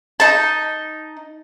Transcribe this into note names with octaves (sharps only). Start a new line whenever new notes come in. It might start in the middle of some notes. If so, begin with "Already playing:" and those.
D#4 A5